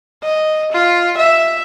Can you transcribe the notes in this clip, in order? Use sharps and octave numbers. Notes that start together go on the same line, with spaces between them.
D#5
F4
E5